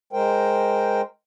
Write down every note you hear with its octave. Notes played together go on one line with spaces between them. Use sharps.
G#3 A#4 C5 G5